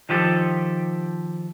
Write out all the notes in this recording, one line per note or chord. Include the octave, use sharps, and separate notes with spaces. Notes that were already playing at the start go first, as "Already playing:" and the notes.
D#3 F3 G4 A4